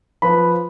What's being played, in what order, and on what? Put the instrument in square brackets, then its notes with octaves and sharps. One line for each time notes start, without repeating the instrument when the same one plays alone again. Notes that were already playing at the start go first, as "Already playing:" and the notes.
[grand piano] F3 B4 B5